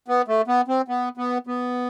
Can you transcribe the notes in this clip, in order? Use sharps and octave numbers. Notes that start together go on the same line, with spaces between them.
B3
A3
B3
C4
B3
B3
B3